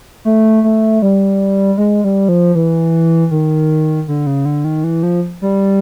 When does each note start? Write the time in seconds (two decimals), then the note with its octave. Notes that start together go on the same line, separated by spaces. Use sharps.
0.25 A3
0.64 A3
1.02 G3
1.78 G#3
2.04 G3
2.29 F3
2.55 E3
3.31 D#3
4.08 D3
4.27 C#3
4.45 D3
4.65 D#3
4.84 E3
5.03 F3
5.42 G3